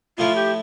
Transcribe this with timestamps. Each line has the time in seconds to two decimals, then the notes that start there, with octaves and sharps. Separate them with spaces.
0.18 A2 F3 A3 E4 F4
0.36 G4